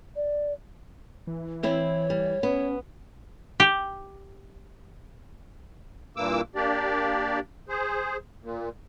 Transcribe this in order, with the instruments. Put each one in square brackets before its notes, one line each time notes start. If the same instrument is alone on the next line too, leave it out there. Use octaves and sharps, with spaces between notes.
[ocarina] D5
[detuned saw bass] E3
[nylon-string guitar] C4 E4 [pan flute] C#5
[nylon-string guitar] G3
[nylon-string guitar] B3 [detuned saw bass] C#4
[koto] G4
[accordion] G2 A#2 E3 A#3 D6 E6
A#3 D4 G4 D5
G#4 C5
A#2